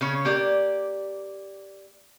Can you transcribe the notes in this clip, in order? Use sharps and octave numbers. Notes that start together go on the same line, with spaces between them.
C#3 C#4 C#5
A#3 G4 D5